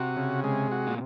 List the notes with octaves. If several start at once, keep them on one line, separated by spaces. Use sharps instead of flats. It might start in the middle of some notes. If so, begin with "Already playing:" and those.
Already playing: C3 F#4
C#3
G#3
F#4
A#2